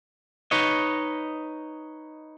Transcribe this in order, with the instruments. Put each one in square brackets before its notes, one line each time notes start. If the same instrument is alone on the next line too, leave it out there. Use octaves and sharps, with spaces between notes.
[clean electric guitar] D#4 B4 C#5 D#5